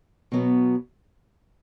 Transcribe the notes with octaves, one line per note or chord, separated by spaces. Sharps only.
B2 F#3 B3